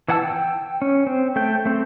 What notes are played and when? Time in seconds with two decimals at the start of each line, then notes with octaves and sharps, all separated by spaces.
0.08 E3 E4 F#5 A5 E6
0.22 G5
0.82 C#4
1.07 C4
1.36 A3 G5
1.65 A3 C4